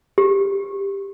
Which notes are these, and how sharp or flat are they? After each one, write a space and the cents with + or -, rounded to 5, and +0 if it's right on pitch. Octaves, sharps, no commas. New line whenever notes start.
G4 +10